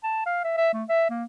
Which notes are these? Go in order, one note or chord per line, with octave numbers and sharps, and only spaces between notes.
A5
F5
E5
E5
A3
E5
A#3